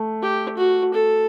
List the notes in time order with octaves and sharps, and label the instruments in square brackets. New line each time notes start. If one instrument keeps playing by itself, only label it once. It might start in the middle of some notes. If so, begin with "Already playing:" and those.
Already playing: [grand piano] A3
[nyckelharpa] G4
F#4
A4